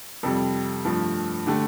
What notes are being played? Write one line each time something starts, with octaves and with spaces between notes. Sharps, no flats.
F2 C3 G3 A4
G2 F3 A3
D3 A3 G4